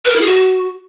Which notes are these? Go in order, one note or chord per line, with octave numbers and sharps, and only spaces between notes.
B4
A#4
E4
G#4
F#4